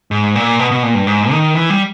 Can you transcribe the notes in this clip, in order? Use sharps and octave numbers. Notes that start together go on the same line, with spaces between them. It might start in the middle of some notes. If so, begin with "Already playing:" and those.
G#2
A#2
B2
B2
A#2
G2
G#2
D#3
E3
G3